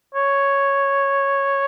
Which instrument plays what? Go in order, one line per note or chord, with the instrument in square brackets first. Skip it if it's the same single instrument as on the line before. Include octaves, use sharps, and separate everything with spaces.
[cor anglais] C#5